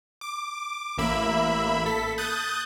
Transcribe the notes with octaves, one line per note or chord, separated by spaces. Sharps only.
D6
A1 A#3 E5 B5
A4 B6
D#6 F#6 G6 A6